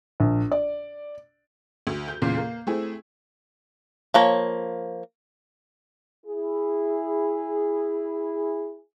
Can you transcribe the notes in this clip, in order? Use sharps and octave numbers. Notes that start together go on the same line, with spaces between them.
A#1
D5
D2
G6
E2 A#2 C#3 C6 C7
A#3
A3 C4 E4 G#4
F3 A#3 C#5
E4 G#4